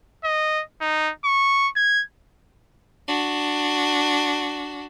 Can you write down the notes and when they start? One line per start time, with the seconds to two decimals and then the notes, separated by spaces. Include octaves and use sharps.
0.24 D#5
0.81 D#4
1.25 C#6
1.77 G#6
3.08 D4 F#4